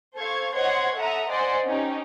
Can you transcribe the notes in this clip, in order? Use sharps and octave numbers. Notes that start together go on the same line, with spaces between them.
A4 C5 F5 C#6 G#6
C5 C#5 D#5 F#5 C6 G#6
A4 E5 F#5 A#5 D#6
C5 D5 D#5 F#5 G#5 C6
C#4 D#4 G4